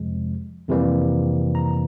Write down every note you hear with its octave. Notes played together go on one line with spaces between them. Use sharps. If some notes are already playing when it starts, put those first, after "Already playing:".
Already playing: F2 C3 F3 G#3
F2 C3 E3 G3 A#3
A#5